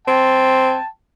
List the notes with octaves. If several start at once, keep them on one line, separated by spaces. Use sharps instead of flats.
C4 G5 A5